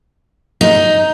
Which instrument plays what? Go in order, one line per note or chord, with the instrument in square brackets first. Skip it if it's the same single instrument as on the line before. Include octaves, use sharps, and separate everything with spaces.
[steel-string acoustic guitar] D#4